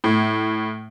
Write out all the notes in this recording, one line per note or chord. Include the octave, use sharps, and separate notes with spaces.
A2